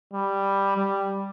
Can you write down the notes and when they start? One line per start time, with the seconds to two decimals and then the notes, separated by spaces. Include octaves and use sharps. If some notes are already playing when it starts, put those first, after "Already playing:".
0.13 G3
0.77 G3